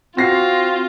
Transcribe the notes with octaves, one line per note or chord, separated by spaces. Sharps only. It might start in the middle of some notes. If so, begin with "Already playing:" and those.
C4 F4 F#4 A#6 C7